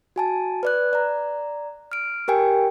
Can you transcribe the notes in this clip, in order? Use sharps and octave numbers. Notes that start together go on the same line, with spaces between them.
F#4 G#5 A5
B4 D5 F#6
D5 A#5
F6 D7
G4 A#4 G5 G#5